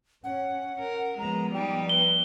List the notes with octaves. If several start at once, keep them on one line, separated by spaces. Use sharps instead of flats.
C#4 F#5
A#4
F3 G#3 B3 A#5
G3 D#4 G5
B4 G7